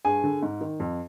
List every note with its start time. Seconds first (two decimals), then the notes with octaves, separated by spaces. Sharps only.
0.05 G2 G#4 G#5
0.24 D3
0.42 G#2
0.61 D#3
0.80 F2